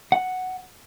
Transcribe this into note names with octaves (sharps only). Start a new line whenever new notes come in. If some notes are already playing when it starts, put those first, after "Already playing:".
F#5